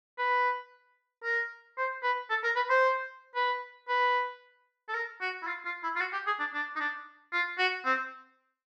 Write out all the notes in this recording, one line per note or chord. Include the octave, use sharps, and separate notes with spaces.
B4
A#4
C5
B4
A4
A#4
B4
C5
B4
B4
A4
A#4
F#4
E4
F4
F4
E4
F4
F#4
G4
G#4
D4
D4
D#4
D4
F4
F#4
C4